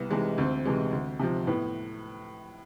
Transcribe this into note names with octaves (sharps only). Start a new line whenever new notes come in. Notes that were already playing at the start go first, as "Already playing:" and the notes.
Already playing: C2 B3
C3 E3 G#3
D2 C4
C3 E3 G#3
D2
C3 F3
A2 B3